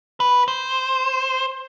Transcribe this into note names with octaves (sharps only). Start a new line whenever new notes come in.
B4
C5